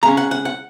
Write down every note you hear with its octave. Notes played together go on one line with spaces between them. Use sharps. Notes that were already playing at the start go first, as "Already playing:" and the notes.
C#3 G#3 C#4 A#5
F#5
F#5
F#5